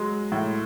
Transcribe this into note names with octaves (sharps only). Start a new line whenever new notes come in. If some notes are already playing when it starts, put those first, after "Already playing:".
Already playing: F#3 G#3
A2